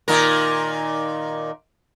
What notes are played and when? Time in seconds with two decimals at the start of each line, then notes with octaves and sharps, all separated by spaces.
0.08 A#2 D#3 A#4